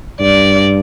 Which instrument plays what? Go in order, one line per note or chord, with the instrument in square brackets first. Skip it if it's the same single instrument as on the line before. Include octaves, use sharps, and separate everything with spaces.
[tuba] G2 [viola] D5